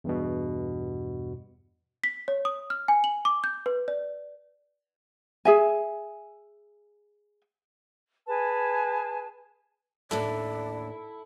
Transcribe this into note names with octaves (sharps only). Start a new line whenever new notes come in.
E2 G2 B2
B6
C#5
D#6
F6
G#5
F#7
D6
G6
B4
D5
G#4 E5 G#5
G#4 B4 G#5 A5
D#2 A2 D3 E4 A4 D5